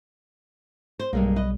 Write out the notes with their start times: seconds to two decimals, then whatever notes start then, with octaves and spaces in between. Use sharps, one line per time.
0.99 C5
1.13 B1 G2 G3 G#3 A#3
1.36 B4 D#5